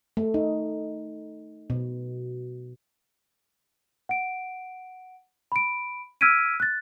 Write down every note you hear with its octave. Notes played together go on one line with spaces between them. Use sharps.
A3
D#4
B2
F#5 D7
B5 D7
E6 F6 G#6 B6 D7 D#7
F#6 A6